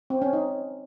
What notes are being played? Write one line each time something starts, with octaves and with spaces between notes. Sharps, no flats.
C4
C#4
D#4